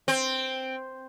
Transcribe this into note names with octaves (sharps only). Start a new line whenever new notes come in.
C4